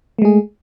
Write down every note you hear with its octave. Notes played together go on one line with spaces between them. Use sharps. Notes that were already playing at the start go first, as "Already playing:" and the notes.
G#3 A3 G#4